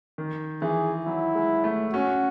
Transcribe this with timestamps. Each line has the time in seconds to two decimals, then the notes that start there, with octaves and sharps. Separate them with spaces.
0.18 D#3
0.62 E3 G#4
1.06 F#3 E4
1.35 G#3
1.64 A3
1.93 C#4 F#4